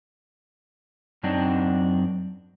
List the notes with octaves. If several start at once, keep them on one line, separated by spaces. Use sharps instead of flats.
F#2 F#3 C4 D4 D#4